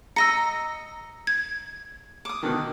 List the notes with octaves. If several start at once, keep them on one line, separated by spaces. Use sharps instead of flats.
D#5 A#5 E6 A#6 C#7
G#6
D6 D#6
B2 D3 D#3